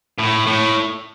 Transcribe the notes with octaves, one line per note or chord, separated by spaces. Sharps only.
A2
A2